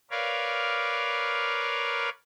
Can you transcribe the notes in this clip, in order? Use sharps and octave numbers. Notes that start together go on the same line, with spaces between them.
A#4 B4 C#5 D5 F5